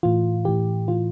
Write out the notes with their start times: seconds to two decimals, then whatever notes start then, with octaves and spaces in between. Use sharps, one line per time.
0.03 A2 E3 F4
0.45 A2 E3 G4
0.88 A2 E3 F4